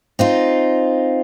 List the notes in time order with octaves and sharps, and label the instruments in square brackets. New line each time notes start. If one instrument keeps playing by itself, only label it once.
[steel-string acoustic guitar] C4 D#4 F4